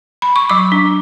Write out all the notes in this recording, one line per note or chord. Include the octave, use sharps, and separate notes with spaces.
B5
C#6
F#3 D6
D4